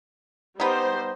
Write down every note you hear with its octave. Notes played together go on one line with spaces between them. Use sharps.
G3 B3 D#4 C5